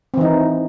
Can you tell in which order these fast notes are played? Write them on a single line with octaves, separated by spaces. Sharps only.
C4 E3 D#4